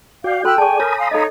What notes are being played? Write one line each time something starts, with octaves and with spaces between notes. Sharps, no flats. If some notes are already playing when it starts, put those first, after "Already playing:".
F#4 D5 F5 G5
F#4 A4 G5 B5 C6 E6 F#6
G#4 D5 G#5 A5 C#6
A#4 C#5 A#5 B5 D#6
F5 G#5 C6
D#4 A4 C#5 D#5 F5